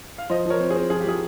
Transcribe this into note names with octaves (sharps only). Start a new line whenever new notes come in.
F5
F3 C5 D#5
F3 A#4 C#5
C4
G#4
C4
F3 G#4
G4
F3 G#4